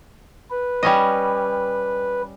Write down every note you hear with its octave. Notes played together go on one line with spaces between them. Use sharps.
B4
G3 C#4 D#5